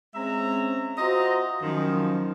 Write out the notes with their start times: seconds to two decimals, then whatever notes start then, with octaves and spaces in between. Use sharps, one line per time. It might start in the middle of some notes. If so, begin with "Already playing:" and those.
0.15 G#3 C4 C#4 E5 A#5
0.98 F4 F#4 C5 D#5 E5 A#5
1.63 F#2 D#3 F3